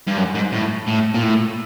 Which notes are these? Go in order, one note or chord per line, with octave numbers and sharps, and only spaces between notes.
G2
F#2
G#2
A2
A2
A#2
A2